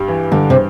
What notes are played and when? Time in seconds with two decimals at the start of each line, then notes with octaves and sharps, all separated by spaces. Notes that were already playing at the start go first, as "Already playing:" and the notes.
Already playing: G2 G3
0.08 E3
0.32 G2 D3
0.50 C3